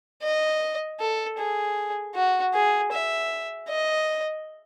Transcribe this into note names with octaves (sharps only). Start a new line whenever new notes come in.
D#5
A4
G#4
F#4
G#4
E5
D#5